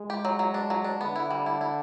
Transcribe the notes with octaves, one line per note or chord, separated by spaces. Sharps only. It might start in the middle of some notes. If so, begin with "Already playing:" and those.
Already playing: G#3
G4
F#3
F#3
D4
F#3
D4
D3 B3
E4
G3
E4
E4